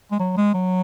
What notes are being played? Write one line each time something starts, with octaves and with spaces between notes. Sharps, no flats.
G#3
F#3
G#3
F#3